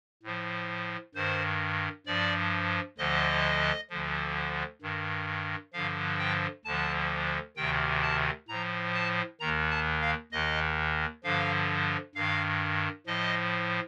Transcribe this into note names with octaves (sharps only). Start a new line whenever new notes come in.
A2 F3
G2 D#3 C5
G2 F3 D5
D2 D3 F3 D#5
D2 D3 F3
G2 D#3
G2 D3 F3 F5
G5
D2 D3 F3 A5
D2 C3 D#3 G5
A5
A2 F3 A#5
A5
D#2 D#3 A#5
A5
F5
D#2 D#3 D#5
G2 D3 F3 F5
G2 D#3 F5
A2 F3 D#5